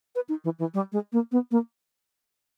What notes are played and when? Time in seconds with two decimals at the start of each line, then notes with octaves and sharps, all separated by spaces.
0.15 B4
0.29 D#4
0.44 E3
0.59 E3
0.74 G3
0.92 G#3
1.13 A#3
1.32 B3
1.51 A#3